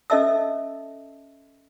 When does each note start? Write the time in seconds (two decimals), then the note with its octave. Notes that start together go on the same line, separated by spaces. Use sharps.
0.10 C#4 A4 D#5 E5 A5 E6